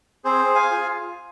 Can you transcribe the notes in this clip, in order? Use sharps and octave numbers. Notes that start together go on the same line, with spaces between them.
C4 G#4 C5
F5 G#5
F4 G#4